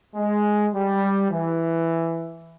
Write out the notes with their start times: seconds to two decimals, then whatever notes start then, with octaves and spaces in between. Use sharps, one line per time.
0.16 G#3
0.73 G3
1.31 E3